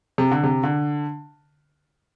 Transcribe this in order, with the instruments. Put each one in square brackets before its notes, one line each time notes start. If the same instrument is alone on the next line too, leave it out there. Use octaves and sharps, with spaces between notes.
[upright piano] C3
D3
C3
D3